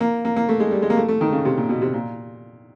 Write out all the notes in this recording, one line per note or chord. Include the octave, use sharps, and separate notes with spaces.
A#3
A#3
A#3
A3
G#3
G3
G#3
A#3
A3
A3
D#3
C#3
C3
A#2
B2
C3
A#2